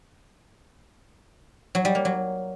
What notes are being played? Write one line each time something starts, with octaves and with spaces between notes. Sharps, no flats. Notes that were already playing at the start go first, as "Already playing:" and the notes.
F#3
G3
A#3
F#3